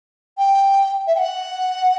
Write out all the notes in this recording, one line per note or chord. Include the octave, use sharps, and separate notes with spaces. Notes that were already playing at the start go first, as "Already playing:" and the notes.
G5
E5
G5
F#5